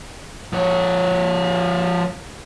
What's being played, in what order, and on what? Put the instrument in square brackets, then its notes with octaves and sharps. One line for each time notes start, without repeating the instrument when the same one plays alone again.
[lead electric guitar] F3 C#5